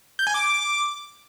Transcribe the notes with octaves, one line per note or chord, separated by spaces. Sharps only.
G6
G#5
D6